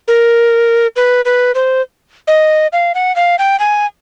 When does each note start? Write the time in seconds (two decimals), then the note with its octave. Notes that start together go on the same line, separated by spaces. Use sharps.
0.08 A#4
0.96 B4
1.25 B4
1.55 C5
2.28 D#5
2.73 F5
2.95 F#5
3.16 F5
3.39 G5
3.60 G#5